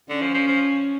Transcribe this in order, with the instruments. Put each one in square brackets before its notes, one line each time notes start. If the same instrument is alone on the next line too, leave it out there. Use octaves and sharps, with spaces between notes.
[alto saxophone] D3 [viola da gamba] C#4
[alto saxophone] F3
F3
F3